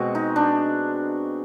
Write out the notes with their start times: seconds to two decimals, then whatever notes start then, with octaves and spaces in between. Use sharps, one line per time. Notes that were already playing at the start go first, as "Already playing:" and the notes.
Already playing: B2 G#3 C4 F#4
0.15 D#4
0.36 D4